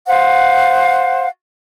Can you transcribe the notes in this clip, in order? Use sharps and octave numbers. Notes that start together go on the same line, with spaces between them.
C5 F5 F#5